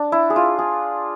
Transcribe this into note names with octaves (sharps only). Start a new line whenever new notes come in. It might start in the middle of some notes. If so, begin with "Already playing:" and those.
Already playing: D4
E4
G#4
F4
G#4